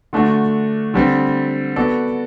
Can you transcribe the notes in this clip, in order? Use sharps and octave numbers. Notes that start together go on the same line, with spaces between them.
D3 A3 D4 F#4
D3 G3 C4
B3 F#4 A4 D5